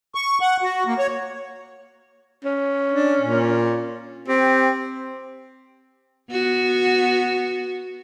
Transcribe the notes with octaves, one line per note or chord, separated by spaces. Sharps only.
C#6
F#5
F#4
A#3
C#5
C#4
D4
A#2
C4 G4
B3 F#4